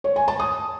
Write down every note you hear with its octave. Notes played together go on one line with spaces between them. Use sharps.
C#5
G#5
A5
D#6